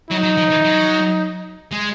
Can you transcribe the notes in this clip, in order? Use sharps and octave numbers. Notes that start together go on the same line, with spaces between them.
F#3 D#4
F#3
F3
E3
F#3
G#3